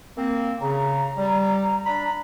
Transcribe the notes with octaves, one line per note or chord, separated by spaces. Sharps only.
A#3 C4
C#3 A#5
G3
D4 B5